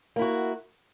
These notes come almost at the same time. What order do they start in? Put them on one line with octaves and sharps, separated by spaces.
A#3 E4 F#4